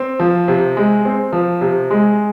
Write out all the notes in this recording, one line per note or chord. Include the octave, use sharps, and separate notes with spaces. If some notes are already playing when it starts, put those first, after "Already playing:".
Already playing: C4
F3
C3
G#3
C4
F3
C3
G#3